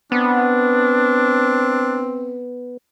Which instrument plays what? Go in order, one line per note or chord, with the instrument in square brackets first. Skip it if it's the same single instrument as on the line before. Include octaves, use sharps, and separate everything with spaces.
[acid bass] B3 [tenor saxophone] C4 [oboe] D4